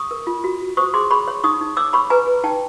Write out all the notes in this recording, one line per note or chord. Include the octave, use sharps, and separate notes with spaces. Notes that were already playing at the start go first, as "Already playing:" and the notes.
Already playing: C#6 D#6
A#4
F4
F#4
F#4
C5 C#6 D#6
G#4 C6 D6
C#5 B5 C#6
C#5
D#4 C#6 D#6
D#4
C#5 D6 E6
C#5 B5 C#6
B4 G#5 A#5
B4
D#4 G5 A5